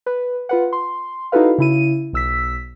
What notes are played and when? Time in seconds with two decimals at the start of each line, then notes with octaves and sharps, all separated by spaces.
0.06 B4
0.49 F4 B4 F#5
0.73 C6
1.32 D#4 E4 F#4 A4 B4 F5
1.58 C#3 E4 D#7
2.13 B1 E6 B6